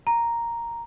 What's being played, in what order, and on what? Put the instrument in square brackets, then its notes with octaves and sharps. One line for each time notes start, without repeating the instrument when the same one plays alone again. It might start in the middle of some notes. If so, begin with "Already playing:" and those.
[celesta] A#5